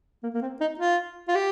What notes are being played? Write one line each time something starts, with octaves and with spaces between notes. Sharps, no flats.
A#3
A#3
C4
D#4
F4
F4
G4